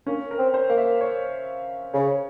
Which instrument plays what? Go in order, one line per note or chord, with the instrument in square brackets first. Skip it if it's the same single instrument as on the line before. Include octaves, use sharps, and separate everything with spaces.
[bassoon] A#3 [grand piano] C#4
[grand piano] A#4
[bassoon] C4
[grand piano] C5
[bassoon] A#3 [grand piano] F5
[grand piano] E5
C#5
[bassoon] C#3 [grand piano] C#5